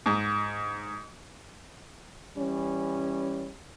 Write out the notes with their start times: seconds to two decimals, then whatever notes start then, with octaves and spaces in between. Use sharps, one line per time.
0.06 G#2
2.37 E3 G3 C#4